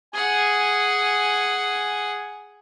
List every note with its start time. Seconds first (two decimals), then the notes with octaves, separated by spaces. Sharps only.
0.14 G#4 F#5 G#5